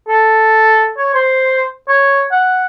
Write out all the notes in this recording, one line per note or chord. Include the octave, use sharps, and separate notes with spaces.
A4
C#5
C5
C#5
F#5